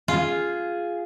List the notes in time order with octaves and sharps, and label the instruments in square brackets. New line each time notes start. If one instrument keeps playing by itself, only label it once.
[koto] F4 [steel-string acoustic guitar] G#4